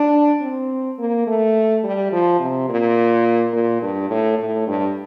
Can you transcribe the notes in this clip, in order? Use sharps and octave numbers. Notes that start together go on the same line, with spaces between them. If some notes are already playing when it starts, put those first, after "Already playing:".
Already playing: D4
C4
A#3
A3
G3
F3
C3
A#2
A#2
G2
A2
A2
G2